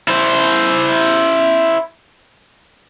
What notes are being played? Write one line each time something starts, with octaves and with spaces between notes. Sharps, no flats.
E4 C5